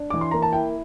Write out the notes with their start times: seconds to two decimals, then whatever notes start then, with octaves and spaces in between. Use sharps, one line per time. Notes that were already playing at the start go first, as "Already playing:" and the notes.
Already playing: D4
0.10 E3 D6
0.21 C6
0.31 A#3 A#5
0.42 A5
0.53 E4 G5